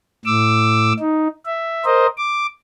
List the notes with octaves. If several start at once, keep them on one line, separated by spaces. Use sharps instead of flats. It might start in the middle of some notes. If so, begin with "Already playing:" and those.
A2 D6 E6
D#4
E5
A#4 C5 D#5
D6